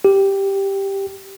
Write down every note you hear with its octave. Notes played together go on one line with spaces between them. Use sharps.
G4